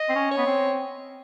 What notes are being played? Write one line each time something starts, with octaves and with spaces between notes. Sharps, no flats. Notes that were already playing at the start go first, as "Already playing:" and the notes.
Already playing: D#5
C4
C#4
C#5
B3
C4